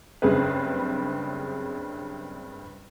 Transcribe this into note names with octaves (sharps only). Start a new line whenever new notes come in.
F#1 G2 C#3 C4 G#4 B4